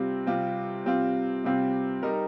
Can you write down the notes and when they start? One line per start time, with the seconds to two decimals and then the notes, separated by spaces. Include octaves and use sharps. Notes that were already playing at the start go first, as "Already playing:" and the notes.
Already playing: C3 G3 C4 F4
0.27 C3 G3 C4 F4
0.85 C3 G3 C4 F4
1.44 C3 G3 C4 F4
2.03 G3 D#4 A#4